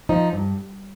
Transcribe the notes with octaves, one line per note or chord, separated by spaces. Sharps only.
F3 D#4
G2